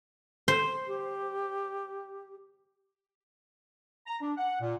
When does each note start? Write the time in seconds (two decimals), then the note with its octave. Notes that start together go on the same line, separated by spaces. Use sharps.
0.48 C5
0.87 G4
4.07 A#5
4.21 D4
4.37 F#5
4.61 A#2